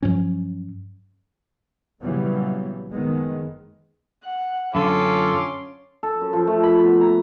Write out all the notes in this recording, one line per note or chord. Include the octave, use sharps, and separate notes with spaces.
G2 F3 F#3 C#4
A#2 C#3 E3 F#3 G3 B3
F#1 D#3 G#3 B3
F#5
F#2 D3 C#4 F4 A4 C6 D6
A4
F#2
F3
A3
B5
B3
A#5